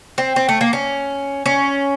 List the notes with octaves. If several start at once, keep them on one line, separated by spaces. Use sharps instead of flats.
C4
C4
A3
A#3
C#4
C#4